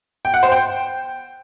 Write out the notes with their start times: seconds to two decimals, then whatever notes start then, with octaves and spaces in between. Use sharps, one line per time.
0.25 G5
0.34 F#5
0.43 C5
0.52 G5